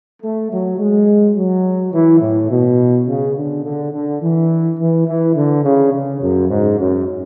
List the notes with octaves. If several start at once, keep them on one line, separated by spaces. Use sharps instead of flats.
A3
F#3
G#3
F#3
E3
A2
B2
C#3
D3
D3
D3
E3
E3
E3
D3
C#3
C#3
F#2
G#2
F#2